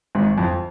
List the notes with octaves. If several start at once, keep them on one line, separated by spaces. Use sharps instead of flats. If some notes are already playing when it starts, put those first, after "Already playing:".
G#1 G#2
F2